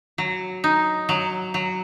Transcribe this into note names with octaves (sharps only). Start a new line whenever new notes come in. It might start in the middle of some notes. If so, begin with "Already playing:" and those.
F#3
D#4
F#3
F#3